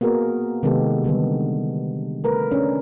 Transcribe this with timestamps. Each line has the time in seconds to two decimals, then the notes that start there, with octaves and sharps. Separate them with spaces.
0.01 A#3 B3 F#4 G#4 A#4
0.63 C3 D#3 G#3 B3 G4 A4
1.04 D3 D#3 G3 B3
2.24 A3 A#4 B4
2.52 C#4 D4